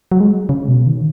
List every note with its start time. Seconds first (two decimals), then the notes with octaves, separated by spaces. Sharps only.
0.12 F#3
0.20 G#3
0.49 C#3
0.68 B2
0.87 D#3